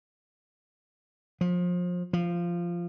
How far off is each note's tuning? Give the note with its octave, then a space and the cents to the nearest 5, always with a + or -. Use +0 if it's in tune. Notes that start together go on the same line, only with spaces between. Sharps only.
F3 +30
F3 -10